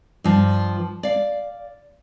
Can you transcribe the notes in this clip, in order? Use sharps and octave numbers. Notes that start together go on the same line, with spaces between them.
G2 F3
D5 F5